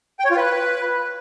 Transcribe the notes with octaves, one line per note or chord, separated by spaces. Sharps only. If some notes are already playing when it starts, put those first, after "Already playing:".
G5
C#5
F4
B4